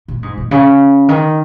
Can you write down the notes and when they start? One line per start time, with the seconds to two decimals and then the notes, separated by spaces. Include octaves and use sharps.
0.08 A#2
0.23 G#2
0.37 A#2
0.51 C#3
1.09 D#3